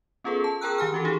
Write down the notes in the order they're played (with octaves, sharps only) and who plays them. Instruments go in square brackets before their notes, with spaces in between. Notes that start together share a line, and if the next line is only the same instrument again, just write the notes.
[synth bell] B3 C#4 F4 G#4 A4 B4
A5
G#4 A#4 G5 A#5 E6 F#6
D#3 G4 G#5 F6
E3 C#4 F#4 G4 A4
D#4 G4 G#4